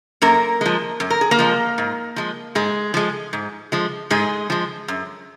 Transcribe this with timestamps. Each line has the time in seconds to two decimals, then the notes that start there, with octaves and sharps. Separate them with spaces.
0.22 F#2 A#3 A#4
0.61 F3 G#3
1.00 F#2
1.10 A#4
1.21 G#4
1.31 A#3 A#4
1.39 F3 G#3
1.78 G#2
2.16 F3 G#3
2.55 G#2 G#3 G#4
2.94 F3 G#3
3.33 G#2
3.72 F3 G#3
4.10 G#2 G#3 G#4
4.50 F3 G#3
4.88 F#2